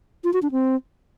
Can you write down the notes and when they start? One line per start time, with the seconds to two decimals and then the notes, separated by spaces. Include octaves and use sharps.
0.24 F4
0.33 F#4
0.42 D4
0.52 C4